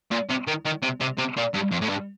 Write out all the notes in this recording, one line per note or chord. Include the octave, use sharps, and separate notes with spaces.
A#2
C3
D#3
D#3
C3
C3
C3
A#2
G2
F2
A2
G2